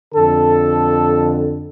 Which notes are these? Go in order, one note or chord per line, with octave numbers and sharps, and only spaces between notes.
F2 D3 A4